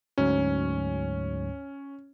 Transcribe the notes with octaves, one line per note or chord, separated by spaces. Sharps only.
D2 G#2 F#3 C#4